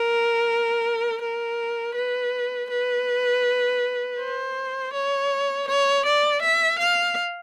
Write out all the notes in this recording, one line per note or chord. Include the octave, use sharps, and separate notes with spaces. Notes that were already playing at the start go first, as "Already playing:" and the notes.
Already playing: A#4
A#4
B4
B4
C5
C#5
C#5
D5
E5
F5